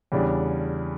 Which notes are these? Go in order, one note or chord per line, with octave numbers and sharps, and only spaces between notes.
E2 C#3 G3 D4